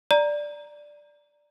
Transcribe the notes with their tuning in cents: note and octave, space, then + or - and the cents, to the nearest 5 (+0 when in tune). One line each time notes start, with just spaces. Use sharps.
D5 +0 A#5 +0